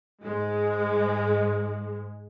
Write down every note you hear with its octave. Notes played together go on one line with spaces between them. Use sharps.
G#2 G#3